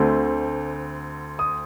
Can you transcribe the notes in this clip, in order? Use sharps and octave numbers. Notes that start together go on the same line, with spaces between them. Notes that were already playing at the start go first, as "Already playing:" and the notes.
Already playing: D2 D3 A3 C4
D#6